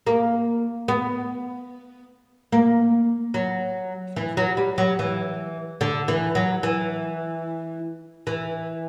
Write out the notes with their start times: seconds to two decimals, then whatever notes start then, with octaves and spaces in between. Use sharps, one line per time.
0.07 A#3
0.88 B3
2.52 A#3
3.34 F#3
4.16 E3
4.37 F#3
4.57 G3
4.78 F#3
4.99 E3
5.81 D3
6.08 E3
6.35 F#3
6.63 E3
8.27 E3